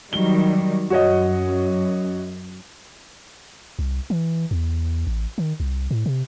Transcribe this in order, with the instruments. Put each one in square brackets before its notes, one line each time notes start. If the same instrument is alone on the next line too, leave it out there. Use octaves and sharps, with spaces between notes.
[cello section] D#3 F#3 G3 [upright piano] G7
[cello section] F#2 [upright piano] F#4 C#5 D#5
[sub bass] C2
E3
E2
A1
D#3
C2
A2
C3